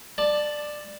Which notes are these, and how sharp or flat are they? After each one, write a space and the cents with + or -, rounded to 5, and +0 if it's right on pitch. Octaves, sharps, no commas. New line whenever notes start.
D5 +15 A5 +0